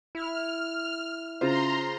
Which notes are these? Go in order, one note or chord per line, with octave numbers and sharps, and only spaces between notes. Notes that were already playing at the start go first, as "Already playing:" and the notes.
E4 F6
C#3 F4 C5 A#5 C6